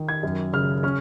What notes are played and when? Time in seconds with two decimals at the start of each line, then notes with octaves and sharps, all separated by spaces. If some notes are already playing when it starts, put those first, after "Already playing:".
Already playing: D#3
0.09 G#6
0.23 F#2
0.53 C#3 F6
0.83 C#4 F6